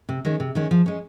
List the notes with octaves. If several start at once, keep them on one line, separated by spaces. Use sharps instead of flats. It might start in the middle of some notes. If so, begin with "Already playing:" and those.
C3
D#3 G#3 C#4
C3
D#3 G#3 C#4
F3
G#3 C#4